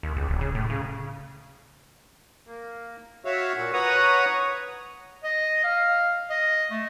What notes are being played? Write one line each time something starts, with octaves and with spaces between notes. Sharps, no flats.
D#2
C#2
D1
C#3
A2
C#3
A#3
F#4 C#5 E5 F5
A#2 F#4
B4 C#5 F#5 A#5 C#6 D#6
D#5
F5
D#5
A3